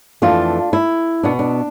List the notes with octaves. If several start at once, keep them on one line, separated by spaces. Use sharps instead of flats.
F2 E3 A3 D4 F4
E4
B2 B3 D4
D4